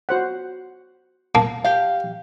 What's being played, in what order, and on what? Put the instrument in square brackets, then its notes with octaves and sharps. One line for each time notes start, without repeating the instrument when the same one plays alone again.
[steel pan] F#4 C5 F#5
[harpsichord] A#3 [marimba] A5
[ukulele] G4 F5